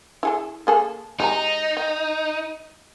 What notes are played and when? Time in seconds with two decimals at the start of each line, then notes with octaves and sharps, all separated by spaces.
0.23 E4 G#4 A4
0.67 A#3 G#4 A4
1.20 G#3 D#4 G4 A#5
1.77 G5